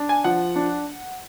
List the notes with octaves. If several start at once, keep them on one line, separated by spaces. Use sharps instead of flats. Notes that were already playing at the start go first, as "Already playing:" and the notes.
Already playing: D4
G#5
F3 F#5
D4